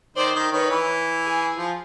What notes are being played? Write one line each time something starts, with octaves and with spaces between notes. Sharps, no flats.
D#3 C5 D5
D#3
D#3 B4 C#5
E3
G#4
F3